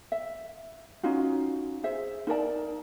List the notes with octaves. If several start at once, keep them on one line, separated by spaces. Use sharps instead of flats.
E5
C#4 D#4 F4 F#4
G#4 C5 E5
D#4 A#4 D5 A5